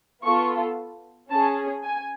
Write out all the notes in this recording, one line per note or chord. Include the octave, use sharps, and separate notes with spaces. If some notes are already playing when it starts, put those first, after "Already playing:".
B3 F4 A4 C#6
C#4 G#4 A5
G#5